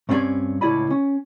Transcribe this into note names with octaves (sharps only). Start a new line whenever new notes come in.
G2 C4 C#4 A4 D5 G#5
C#2 A2 E4 D5 G#5 B5
C#4